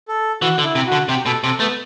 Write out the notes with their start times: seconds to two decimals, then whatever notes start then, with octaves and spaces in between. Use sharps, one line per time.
0.08 A4
0.41 E3 F#4
0.58 D3
0.64 E4
0.75 C3
0.86 F#4
0.92 D3
1.09 C3 G4
1.26 B2 A4
1.43 C3 A4
1.60 A3 B3